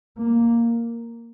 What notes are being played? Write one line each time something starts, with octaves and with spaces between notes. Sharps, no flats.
A#3